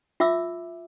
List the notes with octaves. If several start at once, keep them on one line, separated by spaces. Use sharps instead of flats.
F4 E5 D6 E6